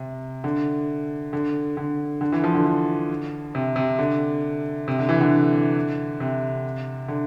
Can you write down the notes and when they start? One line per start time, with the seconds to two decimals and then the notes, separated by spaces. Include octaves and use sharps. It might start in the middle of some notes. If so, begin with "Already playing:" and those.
Already playing: C3
0.44 D3
1.33 D3
1.77 D3
2.21 D3
2.32 E3
2.44 F3
2.55 D3
2.66 D3
3.55 C3
3.76 C3
3.99 D3
4.88 C3
4.99 D3
5.09 E3
5.21 D3
6.20 C3
7.08 D3